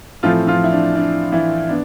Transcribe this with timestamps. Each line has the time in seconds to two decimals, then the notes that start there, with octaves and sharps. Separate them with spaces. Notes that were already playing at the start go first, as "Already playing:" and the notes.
0.23 A2 E3 F3 A3 C4 F4
0.47 F3 F4
0.64 E4
0.72 D4
0.96 D4
1.32 E3 E4
1.69 B3 D4